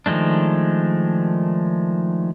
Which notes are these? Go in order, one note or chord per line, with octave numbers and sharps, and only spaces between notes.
D#3 F3 G#3 A3 D4